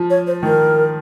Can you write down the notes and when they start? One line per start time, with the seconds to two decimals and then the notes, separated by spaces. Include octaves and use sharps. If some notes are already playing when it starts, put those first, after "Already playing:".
Already playing: F3
0.10 C#5
0.27 C5
0.43 D#3 A#4